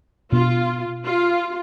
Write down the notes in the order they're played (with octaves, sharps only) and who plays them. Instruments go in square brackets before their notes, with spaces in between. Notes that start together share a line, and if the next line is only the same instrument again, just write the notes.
[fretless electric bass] B2 B3 D4 [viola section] F4
[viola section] F4